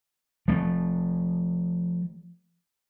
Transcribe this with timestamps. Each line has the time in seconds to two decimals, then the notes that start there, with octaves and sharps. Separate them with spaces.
0.48 F3 A3